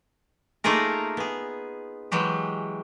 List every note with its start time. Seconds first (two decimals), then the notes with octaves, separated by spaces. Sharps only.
0.64 A3 A#3 D#4 F4 G#4 A#4
1.17 B3 G#4
2.12 E3 F#3 G#3 G4